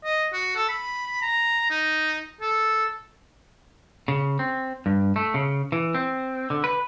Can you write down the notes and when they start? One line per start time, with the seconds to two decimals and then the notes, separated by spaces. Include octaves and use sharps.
0.04 D#5
0.33 F#4
0.56 A4
0.69 B5
1.22 A#5
1.70 D#4
2.41 A4
4.08 C#3
4.39 C4
4.86 G2
5.16 A3
5.34 C#3
5.72 E3
5.95 C4
6.50 D3
6.64 B4